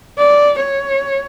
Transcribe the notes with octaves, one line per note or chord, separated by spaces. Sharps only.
D5
C#5